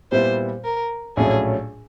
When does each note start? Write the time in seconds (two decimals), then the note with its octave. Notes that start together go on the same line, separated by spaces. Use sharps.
0.12 A#2 G3 B3 E4 C5
0.64 A#4
1.17 A#1 A2 F#3 A3 C#4 G#4